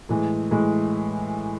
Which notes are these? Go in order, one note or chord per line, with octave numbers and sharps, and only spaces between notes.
A2 E3 G#3
A2 E3 G#3